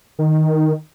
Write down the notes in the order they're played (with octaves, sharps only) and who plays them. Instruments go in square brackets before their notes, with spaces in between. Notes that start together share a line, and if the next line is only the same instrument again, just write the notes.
[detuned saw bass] D#3